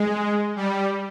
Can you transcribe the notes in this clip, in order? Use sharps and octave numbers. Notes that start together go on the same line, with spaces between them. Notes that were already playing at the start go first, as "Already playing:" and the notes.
Already playing: G#3
G3